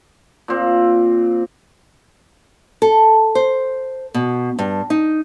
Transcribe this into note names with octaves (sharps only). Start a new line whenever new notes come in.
A#2 C4
A4
C5
B2
G2
D#4